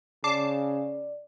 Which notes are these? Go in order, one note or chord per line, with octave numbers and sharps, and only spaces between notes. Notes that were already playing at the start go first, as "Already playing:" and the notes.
C#3 D5 A5 D6 C7